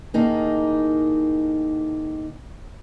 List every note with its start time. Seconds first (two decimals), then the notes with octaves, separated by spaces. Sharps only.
0.14 A2 D#3 A#3 D#4 G#4